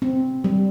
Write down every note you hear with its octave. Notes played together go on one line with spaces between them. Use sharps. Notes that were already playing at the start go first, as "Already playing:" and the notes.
C4
G3